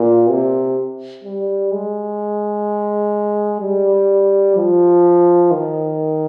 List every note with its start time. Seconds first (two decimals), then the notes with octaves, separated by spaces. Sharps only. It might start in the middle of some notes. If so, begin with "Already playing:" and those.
Already playing: A#2
0.29 C3
1.24 G3
1.72 G#3
3.61 G3
4.56 F3
5.51 D#3